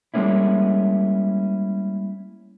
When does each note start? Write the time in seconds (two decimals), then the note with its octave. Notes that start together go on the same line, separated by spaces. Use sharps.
0.14 G3 G#3 A#3 C#4 E4